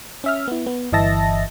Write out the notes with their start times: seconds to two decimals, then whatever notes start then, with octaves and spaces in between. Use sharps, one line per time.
0.24 C#4 E5 F6
0.48 B3 E4
0.66 B3
0.92 G1 E3 D#5 E5 A5 A#6